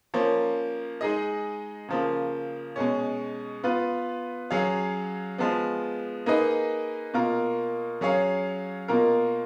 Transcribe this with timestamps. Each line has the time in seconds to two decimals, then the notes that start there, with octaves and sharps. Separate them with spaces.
0.14 F3 A#3 C#4
1.01 G#3 D#4 G#4 D#5
1.88 C#3 F3 A#3
2.76 B2 G#3 C#4
3.64 B3 F4 B4
4.50 F#3 C#4 G#4 C#5 F5
5.38 F3 G#3 B3
6.26 A#3 D#4 G#4 B4 D#5
7.14 B2 A#3 F4 A#4
8.01 F#3 C#4 G#4 C#5 F5
8.88 B2 A#3 F4 A#4